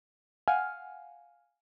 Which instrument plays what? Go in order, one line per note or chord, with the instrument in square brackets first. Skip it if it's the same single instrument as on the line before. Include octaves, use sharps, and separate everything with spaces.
[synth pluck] F5 F#5 G#5 F6